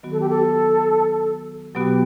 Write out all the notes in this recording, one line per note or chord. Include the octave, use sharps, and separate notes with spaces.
D#3 F#3 B3 F#4
A4
G4
A4
B2 F#3 B3 F#4 G4